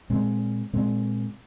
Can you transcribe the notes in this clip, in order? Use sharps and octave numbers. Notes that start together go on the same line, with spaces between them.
A#2 G#3 C4
A#2 G#3 C4